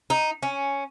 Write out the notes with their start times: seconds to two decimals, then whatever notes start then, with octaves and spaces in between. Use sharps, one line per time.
0.10 D#4
0.43 C#4